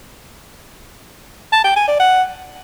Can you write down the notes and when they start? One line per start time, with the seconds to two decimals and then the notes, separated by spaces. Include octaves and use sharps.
1.53 A5
1.64 G5
1.76 G#5
1.88 D5
2.00 F#5